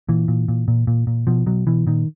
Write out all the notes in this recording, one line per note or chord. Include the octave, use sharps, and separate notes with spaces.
A#2 E3
A#2
A#2
A#2
A#2
A#2
B2 F3
B2 F#3
B2 E3
A#2 D#3